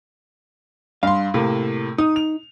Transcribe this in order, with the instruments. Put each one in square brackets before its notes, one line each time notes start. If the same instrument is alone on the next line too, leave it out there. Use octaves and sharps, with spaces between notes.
[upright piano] G2 C6 [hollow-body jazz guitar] F5
[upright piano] A2 C3 A#3
[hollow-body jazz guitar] D#4 [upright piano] D#6
[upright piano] F7